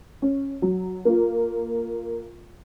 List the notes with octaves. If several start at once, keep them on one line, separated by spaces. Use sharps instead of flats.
C#4
F#3
A#3 F4